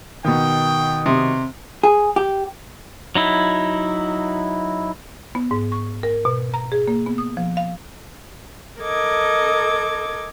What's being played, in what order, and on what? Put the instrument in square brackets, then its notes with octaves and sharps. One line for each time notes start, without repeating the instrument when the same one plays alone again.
[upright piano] B2 D#3 [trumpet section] G5 [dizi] D#6
[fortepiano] C3
[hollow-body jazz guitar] G#4
G4
[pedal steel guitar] F#3 D#4 E4
[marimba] B3
G#2
C#6
A#4
B2
A#5
G#4
A#3
B3
D#6
F3
F5
[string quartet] A4 A#4 D#5 D6 G#6